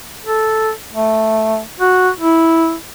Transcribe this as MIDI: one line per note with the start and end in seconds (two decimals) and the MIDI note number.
0.24 0.71 69
0.94 1.60 57
1.80 2.09 66
2.20 2.75 64